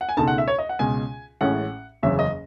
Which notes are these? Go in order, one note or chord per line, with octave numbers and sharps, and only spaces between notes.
F#5
G#5
C#2 B2 A3 D#4 A5
F#5
E5
C#5
D#5
F#5
C#2 B2 G#3 G#5
A1 A2 G#3 C#4 F#5
F#1 E2 C#3 F#3 E5
D#5